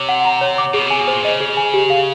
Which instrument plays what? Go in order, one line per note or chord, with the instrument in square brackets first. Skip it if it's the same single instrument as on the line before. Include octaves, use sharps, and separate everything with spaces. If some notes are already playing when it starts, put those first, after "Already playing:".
Already playing: [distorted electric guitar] C3 [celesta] C#5 D6
[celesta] F#5
A#5
C#5
D6
[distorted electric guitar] B2 [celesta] G#4
[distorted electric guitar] C3 [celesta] G#5
[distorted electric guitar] B2
[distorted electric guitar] A#2 [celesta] C5
[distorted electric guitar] C#3 [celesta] D#5
[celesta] G#4
G#5
G4
F5